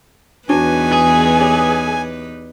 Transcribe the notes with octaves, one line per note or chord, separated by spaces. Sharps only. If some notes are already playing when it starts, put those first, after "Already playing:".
E2 D4 D#4 F#4 B4 C#5 G#5
G#4
G4 C#5